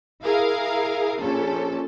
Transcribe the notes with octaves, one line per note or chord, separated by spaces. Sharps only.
E4 G#4 A#4 F5
A#1 C#4 A4